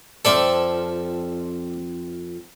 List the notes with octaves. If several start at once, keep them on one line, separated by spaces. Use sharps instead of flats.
F2 F3 C4 A4 D5 E5